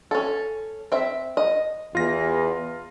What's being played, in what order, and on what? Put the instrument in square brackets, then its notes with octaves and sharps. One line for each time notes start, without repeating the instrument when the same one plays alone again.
[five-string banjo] C#4 A4
C4 E5
D#5
[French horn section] E2 [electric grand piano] F4 A#6